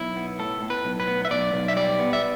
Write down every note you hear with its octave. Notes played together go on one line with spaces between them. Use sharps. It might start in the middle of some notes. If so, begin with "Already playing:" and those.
Already playing: B1 E4
B3
A2 A4
A2
B4
B1
B4
B3
E5
B1 D5
B1
E5
G3 D5
B3
E5